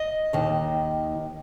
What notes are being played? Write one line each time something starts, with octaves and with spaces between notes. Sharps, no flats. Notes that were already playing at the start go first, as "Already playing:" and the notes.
Already playing: D#5
D#2 D#3